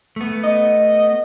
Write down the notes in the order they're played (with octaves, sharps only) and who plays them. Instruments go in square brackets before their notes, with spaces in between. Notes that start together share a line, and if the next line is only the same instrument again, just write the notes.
[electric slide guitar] A3 B3
[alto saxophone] D#5